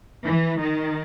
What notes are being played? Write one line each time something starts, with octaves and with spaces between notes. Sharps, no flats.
E3
D#3